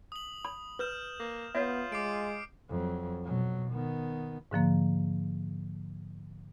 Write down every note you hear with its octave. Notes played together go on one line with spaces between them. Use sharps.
D#6 F#7
B5
B4 F6 G6 E7
A#3
B3 F4 C#5 E5
G#3 D6 C7 D7
F2 F#3
B2 F#3
D#3 B3
G#2 D3 F3 A#3